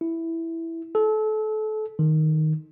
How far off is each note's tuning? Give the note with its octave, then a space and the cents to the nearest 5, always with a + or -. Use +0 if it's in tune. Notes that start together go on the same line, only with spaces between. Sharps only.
E4 +0
A4 -30
D#3 +0